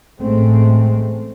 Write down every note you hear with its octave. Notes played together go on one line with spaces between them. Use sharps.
A1 A2 G#3 A3 C4